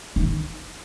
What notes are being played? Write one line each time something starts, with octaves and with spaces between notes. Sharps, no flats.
D#3